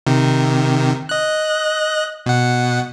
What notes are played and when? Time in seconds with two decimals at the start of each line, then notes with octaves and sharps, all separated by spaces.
0.06 C3 D#3
1.09 D#5 F#6
2.26 B2 F#5